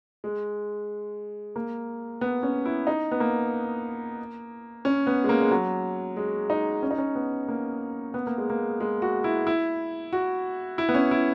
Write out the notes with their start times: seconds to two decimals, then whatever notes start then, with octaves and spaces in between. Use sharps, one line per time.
0.24 G#3
1.56 A#3
2.21 B3
2.43 C#4
2.66 E4
2.87 D#4
3.11 B3
3.20 A#3
4.85 C#4
5.07 B3
5.24 G#3
5.29 A#3
5.41 G#3
5.51 F#3
6.17 G#3
6.50 D#4
6.83 C#4
6.91 D#4
6.98 C#4
7.15 B3
7.48 A#3
8.14 B3
8.27 A#3
8.38 G#3
8.50 A#3
8.80 G#3
9.02 F#4
9.24 E4
9.47 E4
10.13 F#4
10.78 E4
10.89 B3
10.94 C#4
11.11 E4